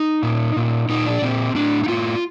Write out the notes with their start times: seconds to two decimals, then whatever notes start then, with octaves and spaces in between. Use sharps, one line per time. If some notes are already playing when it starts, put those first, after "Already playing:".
Already playing: D#4
0.23 A#2
0.57 A#2
0.89 A#2 D#4
1.06 D4
1.22 A#2 C4
1.55 A2 D4
1.84 D#4
1.88 A2 F4